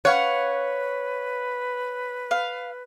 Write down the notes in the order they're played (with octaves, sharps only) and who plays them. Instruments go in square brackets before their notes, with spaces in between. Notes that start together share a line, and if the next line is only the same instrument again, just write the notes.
[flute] B4 [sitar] C#5 [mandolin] F5 F#5
[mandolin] F5